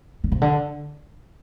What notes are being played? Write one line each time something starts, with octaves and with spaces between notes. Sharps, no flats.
D3
C3
D3